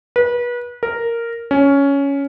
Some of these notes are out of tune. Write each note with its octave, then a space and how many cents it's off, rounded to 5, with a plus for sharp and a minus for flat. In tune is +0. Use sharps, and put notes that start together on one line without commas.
B4 -30
A#4 -5
C#4 +10